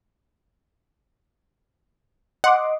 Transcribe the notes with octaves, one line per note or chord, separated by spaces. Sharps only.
D#5 F#5 C6 D6